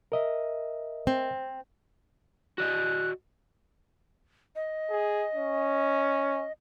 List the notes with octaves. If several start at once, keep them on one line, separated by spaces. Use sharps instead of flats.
A#4 D#5 E5
C4
F#4 D5 D#5 F#6
D#5
G#4
C#4